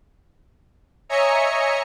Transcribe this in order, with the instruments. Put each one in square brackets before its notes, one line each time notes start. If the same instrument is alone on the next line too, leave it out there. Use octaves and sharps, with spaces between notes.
[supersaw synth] C#5 D#5 E5 G#5 A#5 C#7